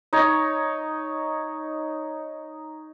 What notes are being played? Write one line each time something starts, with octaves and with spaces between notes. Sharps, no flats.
D#4 C#5